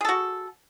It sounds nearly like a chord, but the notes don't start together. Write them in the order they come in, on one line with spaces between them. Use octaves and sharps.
G#4 A4 F#4